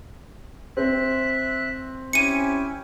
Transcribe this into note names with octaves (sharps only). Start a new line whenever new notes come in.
C4 C5 E5 F#6
C#4 E4 G4 G#5 C#7 D#7